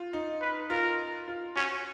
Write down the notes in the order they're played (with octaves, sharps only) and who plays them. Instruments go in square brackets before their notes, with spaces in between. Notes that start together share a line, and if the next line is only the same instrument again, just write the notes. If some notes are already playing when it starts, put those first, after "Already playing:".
Already playing: [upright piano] F4
D#4
[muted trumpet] B4
[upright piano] F4 [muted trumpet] A#4
[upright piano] F4
[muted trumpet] C#4 [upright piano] F#4